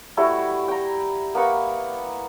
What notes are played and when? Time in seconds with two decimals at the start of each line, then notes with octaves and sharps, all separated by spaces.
0.17 G3 A3 E4 F#4
0.68 G5 A#5
1.35 A#3 B3 B5 C#6